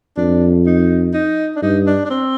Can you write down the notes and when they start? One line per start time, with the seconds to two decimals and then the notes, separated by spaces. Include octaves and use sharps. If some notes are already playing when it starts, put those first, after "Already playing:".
0.17 F2 D4
0.66 D#4
1.13 D#4
1.56 D4
1.62 G2 D#4
1.87 D4
2.05 D4
2.10 C4